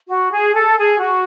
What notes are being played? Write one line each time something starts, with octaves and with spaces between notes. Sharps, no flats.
F#4
G#4
A4
G#4
F#4